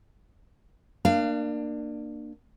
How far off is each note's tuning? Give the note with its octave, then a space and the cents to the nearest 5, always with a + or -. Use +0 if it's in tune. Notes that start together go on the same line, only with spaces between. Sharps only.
A#3 +0 D4 +25 F5 -20